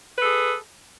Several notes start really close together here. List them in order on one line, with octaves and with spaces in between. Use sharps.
B4 A4 G#4